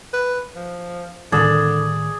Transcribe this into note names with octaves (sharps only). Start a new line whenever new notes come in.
B4
F3
A2 D3 D#3 G3 G#4 D5